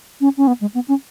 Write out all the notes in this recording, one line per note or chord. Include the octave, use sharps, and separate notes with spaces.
C#4
C#4
B3
G#3
B3
C#4